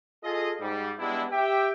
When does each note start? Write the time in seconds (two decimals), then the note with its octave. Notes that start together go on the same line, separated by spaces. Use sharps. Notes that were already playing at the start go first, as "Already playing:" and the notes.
0.24 F4 G#4 A4 D#5
0.61 G#2 G3
0.98 G3 G#3 B3 D4 E4
1.31 G4 E5 G5